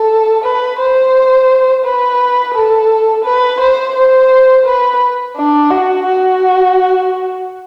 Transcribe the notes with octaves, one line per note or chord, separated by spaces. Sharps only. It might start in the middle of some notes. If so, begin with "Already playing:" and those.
Already playing: A4
B4
C5
B4
A4
B4
C5
C5
B4
D4
F#4
F#4